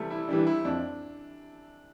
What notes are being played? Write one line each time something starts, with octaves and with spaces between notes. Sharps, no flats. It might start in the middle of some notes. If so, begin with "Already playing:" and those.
Already playing: C3 E3 G3 A3
E4
E3 G3 D4
E4
F2 D4